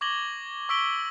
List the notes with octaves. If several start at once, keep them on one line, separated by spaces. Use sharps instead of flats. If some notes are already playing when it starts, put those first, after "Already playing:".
C#6 D6 G#6 A#6 F#7 G7
C#6 E6 B6 D7 G7